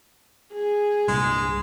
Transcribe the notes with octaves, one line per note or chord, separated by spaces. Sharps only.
G#4
C2 G2 A#2 G#3